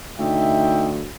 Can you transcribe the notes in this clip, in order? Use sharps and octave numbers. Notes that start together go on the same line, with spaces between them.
D2 D#4 E5 G5